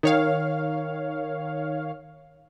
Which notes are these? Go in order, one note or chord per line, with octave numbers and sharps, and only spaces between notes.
D#3 C#5 F5